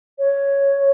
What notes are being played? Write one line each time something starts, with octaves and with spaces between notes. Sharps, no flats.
C#5